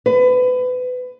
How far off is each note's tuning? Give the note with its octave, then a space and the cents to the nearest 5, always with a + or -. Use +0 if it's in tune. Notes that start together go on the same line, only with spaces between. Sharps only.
B4 +25